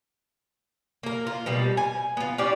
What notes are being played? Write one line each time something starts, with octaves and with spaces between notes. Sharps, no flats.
A#3 A#4
F4
B2 G3 A#3
G#5
B3 F4
C#4 F4 G4 D5